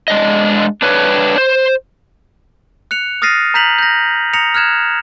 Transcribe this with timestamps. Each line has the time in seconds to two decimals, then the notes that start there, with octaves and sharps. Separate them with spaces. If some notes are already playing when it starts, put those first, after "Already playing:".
0.08 G#3 D4 D#5
0.82 D4 B4 C#5
1.38 C5
2.91 F#6 C#7 F7
3.22 D#6 F6 A6 A#6 C7 D#7
3.54 A#5 G6 B6 F7 F#7
3.78 G6 A#6
4.33 A#5 D#6 A#6 C#7 F7
4.54 F6 F#6 G#6 E7